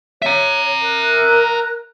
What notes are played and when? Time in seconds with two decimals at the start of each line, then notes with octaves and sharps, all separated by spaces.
0.22 C#5 E5 A#5
0.81 A#4 F#6